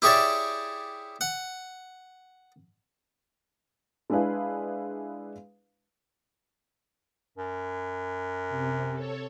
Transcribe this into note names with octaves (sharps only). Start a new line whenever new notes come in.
E4 G4 G#4 C#5 D5 E5
F#5
G#3 D4 E4 G#4 B4 F5
F#2
C3
A4 C#5